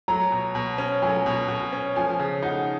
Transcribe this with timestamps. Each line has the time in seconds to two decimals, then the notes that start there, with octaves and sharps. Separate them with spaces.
0.08 F#3 A#5
0.32 B2
0.55 B2
0.78 C#4
1.02 F#3 G#5
1.26 B2
1.48 B2
1.73 C#4
1.96 F3 G#5
2.19 C#3
2.42 D#4 F#5